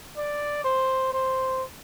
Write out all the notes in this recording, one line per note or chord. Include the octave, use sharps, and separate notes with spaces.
D5
C5
C5